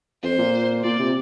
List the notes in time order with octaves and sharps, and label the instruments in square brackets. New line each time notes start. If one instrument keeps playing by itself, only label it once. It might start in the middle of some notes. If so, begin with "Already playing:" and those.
[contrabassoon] F2 [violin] C5
[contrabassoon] A#2
[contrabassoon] A#2 [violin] D5
[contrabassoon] C3